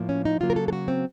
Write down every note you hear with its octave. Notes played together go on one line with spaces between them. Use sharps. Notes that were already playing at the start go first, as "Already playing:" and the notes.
Already playing: A2 F3 A#3
C#4
D#4
C#3 F#3 A#3 F4
A#4
A4
A4
F#4
C4